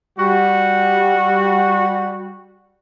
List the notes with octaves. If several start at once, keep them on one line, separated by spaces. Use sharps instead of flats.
G3 F#4